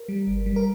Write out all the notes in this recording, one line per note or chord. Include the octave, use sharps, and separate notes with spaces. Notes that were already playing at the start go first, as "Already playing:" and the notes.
Already playing: A#4
G3
G1
G3
A#4